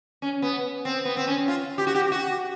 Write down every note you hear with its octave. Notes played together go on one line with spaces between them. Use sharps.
C#4
B3
C4
B3
C4
C#4
F4
G4
F#4
G4
F#4